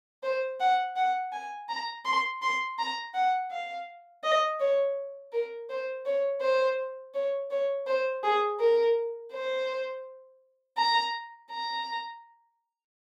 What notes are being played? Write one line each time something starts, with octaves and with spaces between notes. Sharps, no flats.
C5
F#5
F#5
G#5
A#5
C6
C6
A#5
F#5
F5
D#5
C#5
A#4
C5
C#5
C5
C#5
C#5
C5
G#4
A#4
C5
A#5
A#5